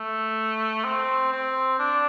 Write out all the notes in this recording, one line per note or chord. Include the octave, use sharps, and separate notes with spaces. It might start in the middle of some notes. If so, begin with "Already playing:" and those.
Already playing: A3
C4
C4
D4